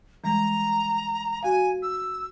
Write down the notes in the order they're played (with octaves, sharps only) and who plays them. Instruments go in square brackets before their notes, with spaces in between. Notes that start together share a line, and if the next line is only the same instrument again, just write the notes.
[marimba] E3 G3 G#3 [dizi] A#5
[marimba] F#4 F5 [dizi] G#5
[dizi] E6